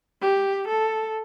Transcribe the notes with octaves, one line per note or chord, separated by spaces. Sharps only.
G4
A4